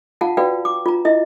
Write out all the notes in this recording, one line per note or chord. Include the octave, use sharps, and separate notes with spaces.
F4 F5 F#5 A5
F#4 B4 D5 F5 G5
D6
F4 A#5
E4 D#5 E5